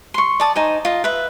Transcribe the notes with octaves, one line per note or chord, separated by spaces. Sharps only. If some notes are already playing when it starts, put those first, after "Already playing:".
C6 C#6
D5 A5 D#6
D#4 C5 G#5
F4 D#5
B4 E5